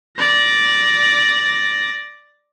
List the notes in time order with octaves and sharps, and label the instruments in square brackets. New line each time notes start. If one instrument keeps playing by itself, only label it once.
[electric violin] D5 A#6